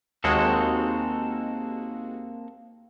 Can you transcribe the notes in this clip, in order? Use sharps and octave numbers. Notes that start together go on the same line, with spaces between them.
D#2 G#3 A#3 C4 F#4 A4